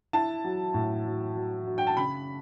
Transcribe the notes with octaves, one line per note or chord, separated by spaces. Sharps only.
E4 A5
F#3
A2
F#3
F#3
F#3
G5
A5
C#3 B5